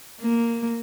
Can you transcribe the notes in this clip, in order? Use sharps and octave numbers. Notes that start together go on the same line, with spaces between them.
A#3